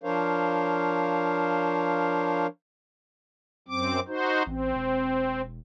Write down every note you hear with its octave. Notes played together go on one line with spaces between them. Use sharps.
F3 D4 A#4 C5 C#5 F5
F#2 C4 D6
D#4 F#4 C5
A1 C4
E1